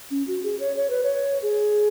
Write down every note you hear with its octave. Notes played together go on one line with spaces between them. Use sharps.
C#4
F#4
G#4
C#5
C#5
B4
C#5
G#4